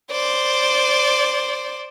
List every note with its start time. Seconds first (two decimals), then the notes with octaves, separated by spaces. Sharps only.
0.11 C5 D5